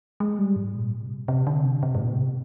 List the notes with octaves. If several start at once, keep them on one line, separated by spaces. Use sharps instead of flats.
G#3
G3
G#2
A#2
C3
C3
D3
C3
C3
G#2
A#2
C3